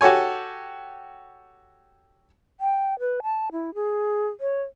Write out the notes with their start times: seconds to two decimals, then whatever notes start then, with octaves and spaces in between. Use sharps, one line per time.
0.01 F#4 G4 A4 C#5 G#5
2.59 G5
3.00 B4
3.23 A5
3.52 E4
3.75 G#4
4.40 C#5